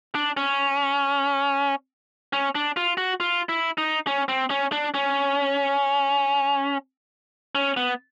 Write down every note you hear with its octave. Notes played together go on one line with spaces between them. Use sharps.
D4
C#4
C#4
D4
F4
F#4
F4
E4
D#4
C#4
C4
C#4
D4
C#4
C#4
B3